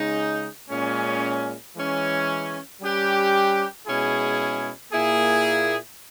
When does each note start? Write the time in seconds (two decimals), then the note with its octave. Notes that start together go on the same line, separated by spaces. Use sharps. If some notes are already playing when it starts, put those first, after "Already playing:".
Already playing: C#3 G#3 D#4
0.70 A#2 G#3 C#4
1.75 E3 G#3 C#4
2.80 G3 C#4 G4 B4
3.86 B2 G#3 C#4 E4 G#4
4.92 A#2 A#3 E4 G#4